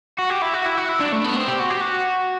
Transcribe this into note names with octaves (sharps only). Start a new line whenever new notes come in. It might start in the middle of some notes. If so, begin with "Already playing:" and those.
F#4
G4
E4
F#4
E4
F#4
E4
D4
A3
B3
C4
G4
F#4
G4
F#4